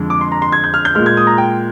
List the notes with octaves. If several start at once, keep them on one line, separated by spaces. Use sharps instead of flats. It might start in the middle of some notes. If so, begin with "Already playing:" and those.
Already playing: F2 D3 G#3
D6
C6
A#5
C6
G#6
G6
F6
G6
A#2 G#3 F6
G#6
D#6
A#5
G5